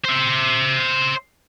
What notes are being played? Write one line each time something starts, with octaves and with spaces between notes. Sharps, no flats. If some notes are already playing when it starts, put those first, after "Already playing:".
C5 E5